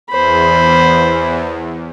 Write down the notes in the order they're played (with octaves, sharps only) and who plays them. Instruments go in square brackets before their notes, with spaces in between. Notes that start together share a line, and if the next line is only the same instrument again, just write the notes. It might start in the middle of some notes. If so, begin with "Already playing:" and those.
[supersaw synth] E2 [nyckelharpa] C5 B5